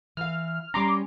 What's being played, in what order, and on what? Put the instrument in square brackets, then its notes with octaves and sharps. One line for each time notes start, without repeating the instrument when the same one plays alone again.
[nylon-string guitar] E3 F5 [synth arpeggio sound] F6
[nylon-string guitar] G3 C#4 [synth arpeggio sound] A#5 C6 D6